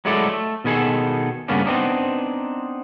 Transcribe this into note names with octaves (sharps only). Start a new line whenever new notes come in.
F#3 G#3 A3 E4 A4 D5
A3
B2 D#3 B3 G#4 A4
G2 C#3 A#3 B3 C#4 D4
B3 C4 D4 D#4